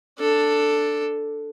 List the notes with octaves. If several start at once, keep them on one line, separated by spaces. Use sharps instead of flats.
D4 A4